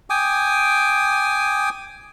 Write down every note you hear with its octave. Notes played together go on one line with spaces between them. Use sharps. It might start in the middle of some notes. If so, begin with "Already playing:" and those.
G5 G#5 D6 D#6